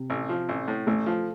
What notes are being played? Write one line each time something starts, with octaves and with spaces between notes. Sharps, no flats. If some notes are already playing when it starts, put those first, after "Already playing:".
Already playing: C3
A1
F3
A1
A2
A1 A3
F3